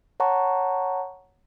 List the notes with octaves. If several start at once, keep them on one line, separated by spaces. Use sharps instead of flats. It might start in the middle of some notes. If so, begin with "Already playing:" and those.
C#5 F#5 A5 A#5 C#6